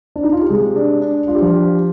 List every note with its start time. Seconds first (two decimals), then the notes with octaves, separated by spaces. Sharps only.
0.16 D4
0.23 D#4
0.33 F4
0.41 G4
0.49 C3 G#3 G#4
0.76 D4
1.01 D4
1.27 D4 F4
1.35 G4
1.42 F3 F4
1.53 G4